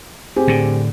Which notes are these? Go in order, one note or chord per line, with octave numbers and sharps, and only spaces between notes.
C4 G4 G#4
A2 D3